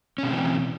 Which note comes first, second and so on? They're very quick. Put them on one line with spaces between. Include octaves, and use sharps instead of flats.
C#4 B2 C4 E3